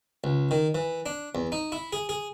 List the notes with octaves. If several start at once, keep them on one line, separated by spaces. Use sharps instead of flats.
C#2
D#3
E3
D4
E2
D#4
E4
G#4
G#4